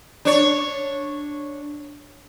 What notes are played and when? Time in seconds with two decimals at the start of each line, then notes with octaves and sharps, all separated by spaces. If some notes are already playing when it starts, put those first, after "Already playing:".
0.25 D4 C#5